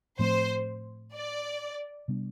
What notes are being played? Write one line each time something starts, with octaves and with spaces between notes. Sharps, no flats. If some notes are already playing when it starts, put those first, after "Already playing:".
A2 F3 A3 C4 C5
D5
C3 G3 B3 D4